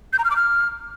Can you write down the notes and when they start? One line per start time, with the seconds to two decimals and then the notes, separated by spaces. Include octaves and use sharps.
0.13 G6
0.19 A#5
0.25 F6
0.30 D6
0.36 F6